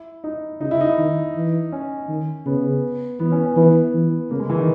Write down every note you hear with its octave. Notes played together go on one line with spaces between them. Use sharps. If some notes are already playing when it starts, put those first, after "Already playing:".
Already playing: E4
D#4
C#3 D#4
E4
D#4
D#3
E3
C#4
D#3
C#3 B3
E3 B3
C#4
C#4
E3 B3
E3
C#3 A#3
G#3
E3
D#3